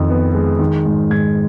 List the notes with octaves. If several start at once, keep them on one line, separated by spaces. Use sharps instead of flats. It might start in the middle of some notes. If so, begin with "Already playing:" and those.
Already playing: F2 D#3
B3
G#3
D#3
G#2
G#2 G#6